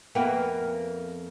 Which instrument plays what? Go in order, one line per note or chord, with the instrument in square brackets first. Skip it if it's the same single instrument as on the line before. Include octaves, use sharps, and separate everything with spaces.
[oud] F2 A#3 B3 [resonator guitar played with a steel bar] E5 G5 G#5